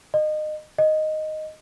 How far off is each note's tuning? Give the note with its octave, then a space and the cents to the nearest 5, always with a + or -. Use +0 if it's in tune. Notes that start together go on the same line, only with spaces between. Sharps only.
D#5 -25
D#5 +0